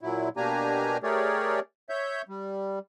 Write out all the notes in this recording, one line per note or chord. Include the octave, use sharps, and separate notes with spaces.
A#2 F#3 E4
B2 A#3 D4 G4 G#5 A#5
A3 G4 G#4 A#4 C#5 D5
C#5 E5 G6
G3